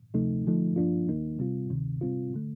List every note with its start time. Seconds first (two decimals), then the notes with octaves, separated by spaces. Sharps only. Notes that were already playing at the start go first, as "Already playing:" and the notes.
0.14 D2 C3 F3 A3 D#4
0.45 D3 F3 A3 D#4
0.76 G2 F3 A#3 D4 F4
1.09 D#2 D#3 A#3 D#4
1.39 C3 G3 C4 F4
1.70 D2 C3 D#3
2.01 C3 G3 C4 F4
2.34 D3 A3